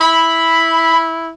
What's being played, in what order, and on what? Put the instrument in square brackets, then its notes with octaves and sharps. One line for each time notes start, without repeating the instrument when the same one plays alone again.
[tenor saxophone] E4 [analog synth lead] B5